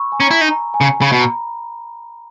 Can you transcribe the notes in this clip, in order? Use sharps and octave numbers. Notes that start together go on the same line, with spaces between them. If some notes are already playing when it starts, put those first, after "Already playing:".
Already playing: B5 C#6 E6
G#5
C#4 A#5
E4
D#4
A#5
G#5
C#3
C#3 B5
B2
A#5